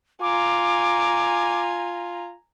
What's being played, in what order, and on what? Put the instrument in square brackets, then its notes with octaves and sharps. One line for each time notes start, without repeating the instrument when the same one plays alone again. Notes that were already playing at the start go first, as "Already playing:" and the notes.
[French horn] F4 [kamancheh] G#5 A#5 [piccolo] D6